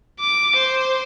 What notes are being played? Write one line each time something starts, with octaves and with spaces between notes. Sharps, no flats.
D6
C5